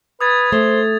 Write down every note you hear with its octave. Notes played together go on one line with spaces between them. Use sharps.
B4 D#6 G#6 A6
A3 C5